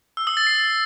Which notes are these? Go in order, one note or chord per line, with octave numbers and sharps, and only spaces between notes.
E6
D#6
A6
C7